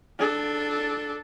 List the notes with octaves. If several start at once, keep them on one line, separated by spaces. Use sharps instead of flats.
D4 A4